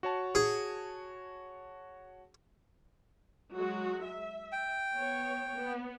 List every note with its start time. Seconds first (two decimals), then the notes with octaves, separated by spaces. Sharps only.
0.03 F#4 C#5 A5
0.35 G#4
3.53 F#3 G#3 F#4
4.04 E5
4.52 G5
4.93 B3 C#5
5.53 B3